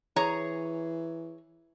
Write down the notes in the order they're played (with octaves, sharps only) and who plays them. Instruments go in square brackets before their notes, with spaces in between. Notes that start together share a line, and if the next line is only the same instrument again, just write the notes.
[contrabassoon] E3 [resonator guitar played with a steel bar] G#4 C#5 A#5